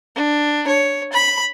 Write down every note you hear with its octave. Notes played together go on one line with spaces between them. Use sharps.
D4
C#5
B5